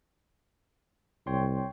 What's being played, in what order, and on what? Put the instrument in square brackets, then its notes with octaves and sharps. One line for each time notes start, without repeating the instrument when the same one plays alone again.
[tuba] C2 [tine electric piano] C#5 G5 C6